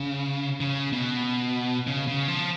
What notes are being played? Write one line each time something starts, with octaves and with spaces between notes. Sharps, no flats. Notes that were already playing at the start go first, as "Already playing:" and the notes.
Already playing: C#3
C#3
B2
C#3
C#3
F3